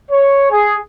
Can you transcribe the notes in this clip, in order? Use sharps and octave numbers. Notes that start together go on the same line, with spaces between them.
C#5
G#4